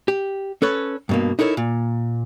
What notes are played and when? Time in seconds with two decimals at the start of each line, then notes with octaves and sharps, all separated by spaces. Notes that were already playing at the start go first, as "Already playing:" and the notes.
0.08 G4
0.62 C#4 A4 B4 C#5
1.09 G2 B2 A#3
1.39 D#4 E4 A4 A#4 C#5
1.57 A#2